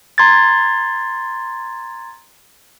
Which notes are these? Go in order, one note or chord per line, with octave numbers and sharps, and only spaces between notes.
A#5 C6 G#6 A6